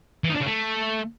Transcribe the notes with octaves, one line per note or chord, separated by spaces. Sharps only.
E3
D#4
D4
C#3
A3